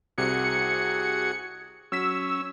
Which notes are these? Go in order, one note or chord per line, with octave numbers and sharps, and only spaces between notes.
C2 C3 F#4 G#4 C#7
F#3 C#4 E6 B6